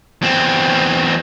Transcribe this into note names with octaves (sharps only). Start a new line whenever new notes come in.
E2 C4